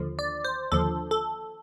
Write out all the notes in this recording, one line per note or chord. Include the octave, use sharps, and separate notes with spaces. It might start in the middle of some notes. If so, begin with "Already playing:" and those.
Already playing: D#2 D3 F3
D5
C5
D#2 D3 F3 A4
A4